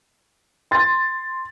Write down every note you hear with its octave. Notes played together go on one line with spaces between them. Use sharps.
C6 A6